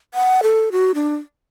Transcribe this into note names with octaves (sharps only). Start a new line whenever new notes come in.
F#5
A4
F#4
D4